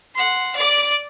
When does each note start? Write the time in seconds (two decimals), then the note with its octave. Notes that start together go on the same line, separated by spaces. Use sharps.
0.15 F#5 C6
0.56 D5 D6